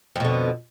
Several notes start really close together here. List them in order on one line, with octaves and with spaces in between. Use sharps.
F2 B2 D3